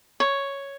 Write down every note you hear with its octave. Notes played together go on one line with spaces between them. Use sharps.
C#5